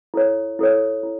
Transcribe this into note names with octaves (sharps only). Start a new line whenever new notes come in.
E4 A4 C#5
E4 A4 C#5
E4